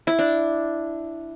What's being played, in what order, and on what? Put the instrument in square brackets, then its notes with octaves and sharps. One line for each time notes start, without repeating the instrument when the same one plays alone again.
[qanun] E4
D4